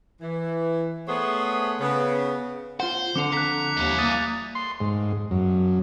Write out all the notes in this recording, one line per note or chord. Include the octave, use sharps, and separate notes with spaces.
E3
A3 B3 G#4 C5 C#5 F#5
C#3 B3
F4 C5 F#5
D3 F3 C4 D4 D6 C#7 F7
D3 A#5 F#6 B6
D#2 G3 E4
A#3 D#6 A6 D#7
C6
G#2
F#2